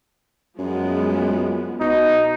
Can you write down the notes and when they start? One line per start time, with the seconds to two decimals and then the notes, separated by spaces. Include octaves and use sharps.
0.59 F#2 F3 G#3 B3
1.80 B2 D#4